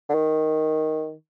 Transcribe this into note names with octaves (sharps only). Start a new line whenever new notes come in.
D3
D#3